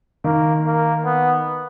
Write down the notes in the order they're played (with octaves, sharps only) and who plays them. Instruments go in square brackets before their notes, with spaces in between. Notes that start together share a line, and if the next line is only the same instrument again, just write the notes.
[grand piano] D#3 [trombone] A#3
[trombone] A#3
B3